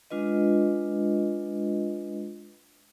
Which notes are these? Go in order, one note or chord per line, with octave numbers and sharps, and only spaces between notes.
G#3 D4 F4 B4 D#5